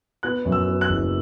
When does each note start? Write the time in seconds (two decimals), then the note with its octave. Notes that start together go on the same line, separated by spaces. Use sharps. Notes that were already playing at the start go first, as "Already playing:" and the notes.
0.23 B3 F#6
0.45 F#2
0.52 E6
0.68 B3
0.81 F#6
0.89 F#1